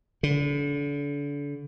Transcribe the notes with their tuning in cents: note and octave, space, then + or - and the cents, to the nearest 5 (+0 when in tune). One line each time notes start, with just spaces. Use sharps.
D3 -35